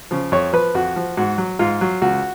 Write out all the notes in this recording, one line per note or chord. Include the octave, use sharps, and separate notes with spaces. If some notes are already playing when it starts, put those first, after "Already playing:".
C#3 F3
F2 C#5
F3 B4
F2 F#4
F3
G#2 F#4
F#3
G#2 F4
F#3
C#2 F#4